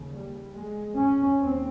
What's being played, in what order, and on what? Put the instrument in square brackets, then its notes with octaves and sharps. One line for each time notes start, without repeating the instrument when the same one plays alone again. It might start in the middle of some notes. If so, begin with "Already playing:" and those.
Already playing: [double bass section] D#2 C#3
G3
G#3
C#4
D#2 C4